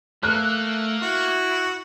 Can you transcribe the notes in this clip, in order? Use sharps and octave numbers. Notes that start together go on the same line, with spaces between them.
A3 A#3 F#6
E4 F#4